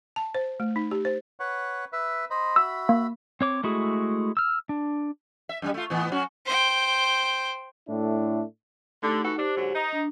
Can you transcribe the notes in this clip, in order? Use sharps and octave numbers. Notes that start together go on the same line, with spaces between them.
A5
C5
A3
D#4
G4
C5
B4 C#5 F#5
B4 E5
C5 D#5 B5
F#4 E5 B5 E6
A#3
C4 C#5 D6
G#3 A3 E4 F#4 G#4
E6 F6
D4
E5
F#2 C#3 G3
A3 F4
A2 E3 B3
F#3 C#4 F#4
C5 G5
A2 A3 D4 E4
D3 A3 D#4 G4
E3 D#4 F#4 A4
D4 G4 C5
G#2 D3 F#3
D#4
D4